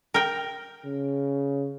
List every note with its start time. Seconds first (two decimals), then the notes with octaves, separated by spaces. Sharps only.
0.14 A#4 G5
0.85 C#3